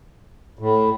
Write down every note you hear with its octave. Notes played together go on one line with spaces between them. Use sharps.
A2